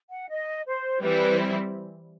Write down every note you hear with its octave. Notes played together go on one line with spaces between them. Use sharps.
F#5
D#5
C5
E3 G3 C4 E4 B4